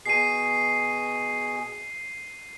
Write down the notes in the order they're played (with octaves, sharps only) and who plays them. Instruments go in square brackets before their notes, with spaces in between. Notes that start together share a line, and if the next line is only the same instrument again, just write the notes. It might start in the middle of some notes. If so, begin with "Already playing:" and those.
[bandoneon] B2 G#4 [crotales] C7 D#7